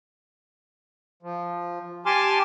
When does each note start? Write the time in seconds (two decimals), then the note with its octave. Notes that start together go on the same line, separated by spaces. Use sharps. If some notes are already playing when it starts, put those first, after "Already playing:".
1.23 F3
2.06 G4 G#5 A5 C6 D6 F6